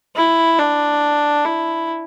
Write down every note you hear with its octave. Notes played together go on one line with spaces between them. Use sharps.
E4
D4
E4